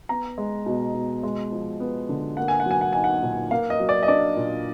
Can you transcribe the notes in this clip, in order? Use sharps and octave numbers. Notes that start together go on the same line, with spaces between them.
B3 A#5
G#3
B2
B2
G#3
F3
B3
D3
A#3 F#5
G#5
F#5
F#3
G#5
F#5
D#4 G#5
F#5
A#2
A#3 F5
D#5
F#3
D5
D#5
D4 D5
A#2